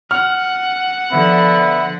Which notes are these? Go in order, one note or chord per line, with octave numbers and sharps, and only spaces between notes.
F#5 F6
D3 F3 B3 E5 B5